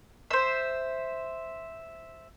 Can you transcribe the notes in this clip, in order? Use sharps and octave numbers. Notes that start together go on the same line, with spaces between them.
C5 E5